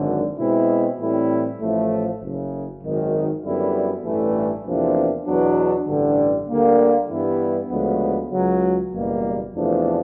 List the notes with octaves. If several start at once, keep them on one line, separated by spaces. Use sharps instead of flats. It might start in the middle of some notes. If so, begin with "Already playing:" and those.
Already playing: G#1 F#2 D3
B2 G#3 C4 E4
A2 E3 G3 C4 E4
A1 A2 F3 A3
F#1 F#2 C#3
G#1 F#2 D#3
F#2 D3 G3 B3 E4
A1 G2 E3 A3
E2 C3 F3 A#3 D4
E2 B2 F#3 B3 D4
A1 G2 D3
D2 D3 G3 A#3
G2 E3 G3 B3 E4
D2 C#3 F3 G#3 B3
C#2 C#3 F#3
F#1 E2 B2 G3 A#3
E2 C3 F3 A3 D4